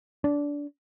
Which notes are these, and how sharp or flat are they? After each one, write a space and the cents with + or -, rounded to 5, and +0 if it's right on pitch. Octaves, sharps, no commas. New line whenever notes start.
D4 -20